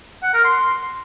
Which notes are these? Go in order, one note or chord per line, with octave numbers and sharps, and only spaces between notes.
F#5
A#4
C6